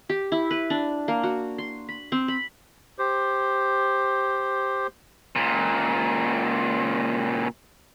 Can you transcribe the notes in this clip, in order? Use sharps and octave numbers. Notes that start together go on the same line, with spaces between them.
G4
E4
B4
D4
A#3
F#4
C6
B5
C4
B5
G4 C5
C#2 A#2